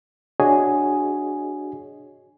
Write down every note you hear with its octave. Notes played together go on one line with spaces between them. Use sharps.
D4 F#4 G#4 C#5 D#5 G#5